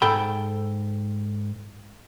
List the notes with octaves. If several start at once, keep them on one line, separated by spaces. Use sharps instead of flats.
G#2 A4 G5 B5